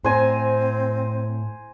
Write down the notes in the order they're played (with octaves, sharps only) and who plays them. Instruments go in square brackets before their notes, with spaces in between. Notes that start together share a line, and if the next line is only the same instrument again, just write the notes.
[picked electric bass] A2 [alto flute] C4 [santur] C5 G#5 A#5